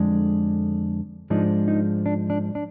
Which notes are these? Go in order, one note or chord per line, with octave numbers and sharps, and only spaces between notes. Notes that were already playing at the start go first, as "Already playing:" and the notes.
Already playing: F2 D3 G#3 D4
G#2 F3 G#3 D4 D#4
D#4
D4
D4
D4